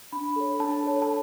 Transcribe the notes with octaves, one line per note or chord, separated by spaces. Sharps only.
D4 B5
A4 C#5
D4 A5
A4 C#5
A5